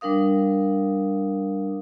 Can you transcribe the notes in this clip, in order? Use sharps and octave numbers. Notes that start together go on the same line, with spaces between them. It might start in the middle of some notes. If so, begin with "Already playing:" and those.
G3 D4 A#4 F5 D#6